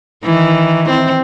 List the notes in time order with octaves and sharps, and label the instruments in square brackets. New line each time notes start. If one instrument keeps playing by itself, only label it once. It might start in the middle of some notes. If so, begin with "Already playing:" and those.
[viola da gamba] D#3 E3
C4